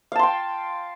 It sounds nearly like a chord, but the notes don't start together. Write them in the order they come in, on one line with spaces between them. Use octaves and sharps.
F5 A5 C6 G5